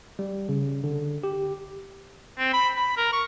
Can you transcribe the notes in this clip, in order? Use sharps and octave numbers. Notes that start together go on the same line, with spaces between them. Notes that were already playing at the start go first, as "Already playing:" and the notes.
G3
C#3
D3
G4
C4
B5
B5
A#4
C#6